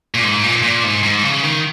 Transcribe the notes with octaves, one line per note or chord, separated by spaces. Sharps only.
A#2
G#2
A#2
A#2
G#2
G#2
C#3
D#3